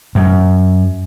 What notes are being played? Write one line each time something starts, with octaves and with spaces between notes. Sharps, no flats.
F#2